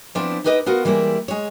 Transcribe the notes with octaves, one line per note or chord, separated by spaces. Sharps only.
F3 B3 C4 D4 E4
D#4 E4 G4 B4 D5 D#5
B3 F4 F#4 A#4
E3 G3 G#3 A#3 E4
G#3 C#5